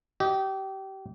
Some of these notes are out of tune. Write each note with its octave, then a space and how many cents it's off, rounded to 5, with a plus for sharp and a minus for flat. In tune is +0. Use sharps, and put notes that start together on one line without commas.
G4 -25 D#5 +0